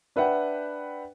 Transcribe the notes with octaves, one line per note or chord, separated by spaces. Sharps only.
D4 B4 E5 F#5 G5